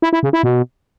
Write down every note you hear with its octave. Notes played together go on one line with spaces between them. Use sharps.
E4
E4
C#3
E4
B2